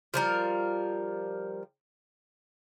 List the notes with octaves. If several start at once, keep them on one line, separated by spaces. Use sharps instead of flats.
F3 G3 A#4